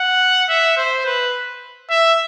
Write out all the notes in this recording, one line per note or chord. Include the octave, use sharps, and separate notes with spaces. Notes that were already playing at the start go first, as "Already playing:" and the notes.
Already playing: F#5
E5
C5
B4
E5